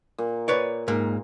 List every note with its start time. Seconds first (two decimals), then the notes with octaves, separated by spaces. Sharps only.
0.18 A#2
0.48 B4 C#5 D5
0.88 G#2 A#3